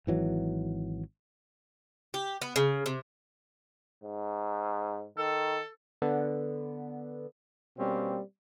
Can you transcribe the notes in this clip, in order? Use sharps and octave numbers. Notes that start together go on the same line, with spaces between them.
G#1 E3 F#3
G4
B3
C#3
C3
G#2
D#3 A4
D3 B3
B2 G3 A#3 C4 C#4